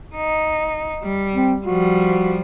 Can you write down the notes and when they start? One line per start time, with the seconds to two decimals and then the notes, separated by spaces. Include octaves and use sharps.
0.15 D#4
1.03 G3
1.35 C4
1.66 F3 G3 F#4